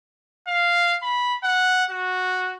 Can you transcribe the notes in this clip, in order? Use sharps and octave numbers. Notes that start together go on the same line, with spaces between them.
F5
B5
F#5
F#4